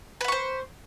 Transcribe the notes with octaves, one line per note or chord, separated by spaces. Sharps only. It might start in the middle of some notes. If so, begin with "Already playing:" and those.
B4 C5 F#5 C#6